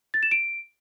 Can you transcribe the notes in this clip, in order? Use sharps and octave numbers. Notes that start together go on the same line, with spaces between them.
A6
E7
D7